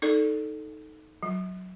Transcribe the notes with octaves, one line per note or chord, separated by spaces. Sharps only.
D#4 A4 D5
F#3